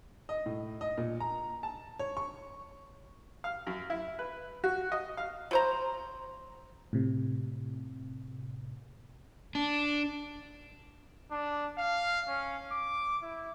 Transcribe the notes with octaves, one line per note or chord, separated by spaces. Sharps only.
D#5
A2
D#5
A#2
A#5
A5
C#5
C#6
F5
F#2
E4
B4
F#4
D#5
F5
F#3 C5 A#5
A2 C3
D4
D4
F5
C#4
D6
E4